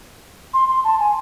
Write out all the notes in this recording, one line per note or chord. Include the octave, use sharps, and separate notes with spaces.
C6
C6
A5
G#5